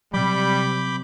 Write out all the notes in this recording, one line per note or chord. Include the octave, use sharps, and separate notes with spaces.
C3 F#3 G3 B5 D6 G6